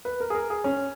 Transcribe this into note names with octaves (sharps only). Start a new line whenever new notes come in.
B4
A#4
G#4
A#4
G#4
C#4